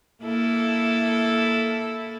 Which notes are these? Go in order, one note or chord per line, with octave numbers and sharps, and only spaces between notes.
A#3 E4 A4